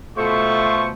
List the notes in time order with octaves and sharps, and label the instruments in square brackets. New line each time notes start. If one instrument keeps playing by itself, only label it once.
[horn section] B2 A3 [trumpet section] F4 C5 C#6